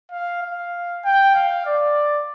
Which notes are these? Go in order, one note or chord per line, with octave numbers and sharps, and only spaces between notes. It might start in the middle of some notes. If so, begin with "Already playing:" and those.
F5
F5
G5
F5
D5